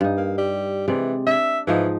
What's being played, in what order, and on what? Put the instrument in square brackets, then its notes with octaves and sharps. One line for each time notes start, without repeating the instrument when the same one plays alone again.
[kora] G2 D#4
[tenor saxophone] A#3
G3
[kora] C3 G#3 D5 [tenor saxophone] E3
[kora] D4 [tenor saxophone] E5
[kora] G#2 F3 D#4 [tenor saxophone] E3